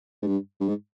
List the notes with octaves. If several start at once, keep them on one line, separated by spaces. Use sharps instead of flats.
G#2
G2
G2
G#2